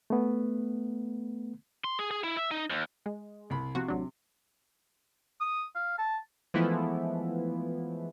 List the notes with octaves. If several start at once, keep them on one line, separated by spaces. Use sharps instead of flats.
A3 B3
C6
G#4
G#4
E4
E5
D#4
D#2
G#3
C2 B5
C3 F3 F#4
A1 F#3 D4
D#6
F5
A5
E3 F3 G#3 A3 B3 E4